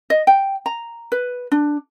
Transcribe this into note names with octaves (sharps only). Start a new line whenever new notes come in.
D#5
G5
A#5
B4
D4